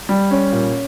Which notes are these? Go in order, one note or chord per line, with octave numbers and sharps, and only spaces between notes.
G3
C#4
A#2